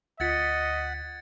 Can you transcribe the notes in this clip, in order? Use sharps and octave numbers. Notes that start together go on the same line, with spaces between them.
D2 F4 D#5 F#5 G#6 A6 B6 C#7